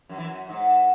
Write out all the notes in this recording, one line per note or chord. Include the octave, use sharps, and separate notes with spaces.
F#2
E3
F#2
G#2